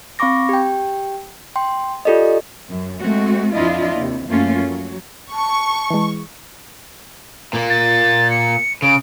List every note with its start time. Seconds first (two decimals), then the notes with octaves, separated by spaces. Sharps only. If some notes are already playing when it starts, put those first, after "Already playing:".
0.19 C4 F5 B5 C#6 D6 A#6
0.49 G4 G5
1.56 G5 C6
2.05 F4 G4 A4 D5 D#5
2.68 F#2
3.00 G#3 A3 C4 F#4
3.52 F2 F3 D4 E4 F4 D#5
3.96 D#2 C3
4.27 F#2 F3 A3 A#3 C#4 F4
4.64 F#3
5.32 A5 C#6
5.90 E3 G#3
7.53 A#2 A#3
7.70 A6
8.31 C#7
8.82 C#3 D7